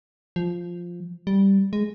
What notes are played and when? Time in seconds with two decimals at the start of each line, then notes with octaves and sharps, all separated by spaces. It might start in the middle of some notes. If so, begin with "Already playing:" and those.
0.36 F3
1.27 G3
1.73 G#3